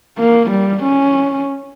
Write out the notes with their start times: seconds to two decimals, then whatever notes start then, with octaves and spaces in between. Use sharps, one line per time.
0.19 A#3
0.51 G3
0.83 C#4